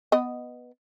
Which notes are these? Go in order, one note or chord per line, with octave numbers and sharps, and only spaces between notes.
B3 D#5